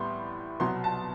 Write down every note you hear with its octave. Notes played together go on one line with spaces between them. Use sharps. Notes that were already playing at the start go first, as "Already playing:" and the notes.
Already playing: A2 G3 B3 C6
C2 B2 F#3 B3 C6
A5